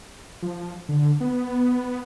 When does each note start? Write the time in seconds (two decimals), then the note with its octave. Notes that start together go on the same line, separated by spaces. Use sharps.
0.42 F3
0.89 D3
1.20 B3